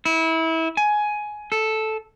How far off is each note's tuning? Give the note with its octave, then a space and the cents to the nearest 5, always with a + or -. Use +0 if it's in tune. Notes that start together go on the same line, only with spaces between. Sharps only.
E4 -25
G#5 +15
A4 -5